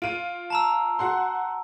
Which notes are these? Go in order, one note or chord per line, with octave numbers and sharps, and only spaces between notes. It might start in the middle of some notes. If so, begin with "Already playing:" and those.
F4 D7 D#7
A5 A#5 E6
F#4 F#5 C6